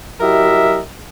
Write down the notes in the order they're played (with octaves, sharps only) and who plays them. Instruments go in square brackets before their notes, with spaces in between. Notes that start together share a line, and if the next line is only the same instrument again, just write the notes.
[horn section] F#3 E4 G4 A#4 D#5 E5